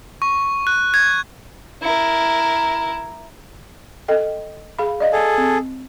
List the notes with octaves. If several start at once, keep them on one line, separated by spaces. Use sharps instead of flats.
C#6
F#6
G#6
E4 A#4
A4 D#5 G5
G#4 F5 B5
D5 D#5 F5
G#4 A4
C4